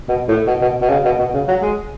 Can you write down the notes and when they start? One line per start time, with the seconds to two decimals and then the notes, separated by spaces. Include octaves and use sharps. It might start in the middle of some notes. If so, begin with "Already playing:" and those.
0.09 B2
0.28 A2
0.47 B2
0.62 B2
0.81 B2
0.90 C#3
1.05 B2
1.19 B2
1.34 C#3
1.48 F#3
1.62 G#3